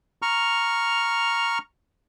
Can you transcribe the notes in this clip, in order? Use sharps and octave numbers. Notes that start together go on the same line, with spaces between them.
A#5 C#6 F6